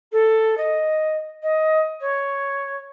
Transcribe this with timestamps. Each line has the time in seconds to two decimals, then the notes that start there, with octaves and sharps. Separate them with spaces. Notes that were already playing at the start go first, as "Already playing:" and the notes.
0.12 A4
0.57 D#5
1.42 D#5
2.00 C#5